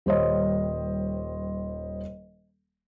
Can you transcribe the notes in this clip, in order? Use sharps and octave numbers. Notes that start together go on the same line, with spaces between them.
D#1 G3 C5 C#5 D#5